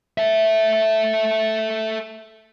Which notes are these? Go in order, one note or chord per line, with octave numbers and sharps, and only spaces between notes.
A4 E5